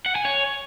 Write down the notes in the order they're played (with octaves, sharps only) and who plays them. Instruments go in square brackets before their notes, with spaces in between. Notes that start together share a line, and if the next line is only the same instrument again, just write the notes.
[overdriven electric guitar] F#5
G#5
C#5